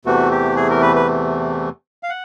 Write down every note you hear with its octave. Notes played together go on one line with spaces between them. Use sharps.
E2 C3 E3 A3 F#4
G4
G#4
A#4
B4
B4
F5
F#5